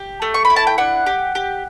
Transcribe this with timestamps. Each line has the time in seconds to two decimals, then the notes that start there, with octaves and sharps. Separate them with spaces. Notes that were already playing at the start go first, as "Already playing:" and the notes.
Already playing: G4
0.22 A3
0.34 C#6
0.45 B5
0.50 E4
0.56 A5
0.67 G5
0.78 D4 F#5
1.06 G4
1.35 G4